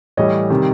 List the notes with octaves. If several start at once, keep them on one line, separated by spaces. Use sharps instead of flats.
A2 E3 G3 C#5 D#5
C3 D#3 G3